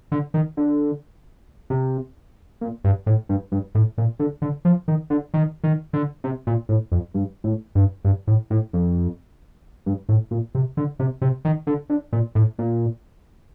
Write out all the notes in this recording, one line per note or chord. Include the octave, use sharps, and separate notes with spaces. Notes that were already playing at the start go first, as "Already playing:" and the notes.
D3
D#3
D3
C3
A#2
G2
A2
G2
G2
A2
A#2
D3
D3
F3
D#3
D3
D#3
D#3
D3
C3
A#2
A2
F2
G2
A2
G2
G2
A2
A2
F2
G2
A2
A#2
C3
D3
C3
C3
D#3
D3
D3
A#2
A2
A#2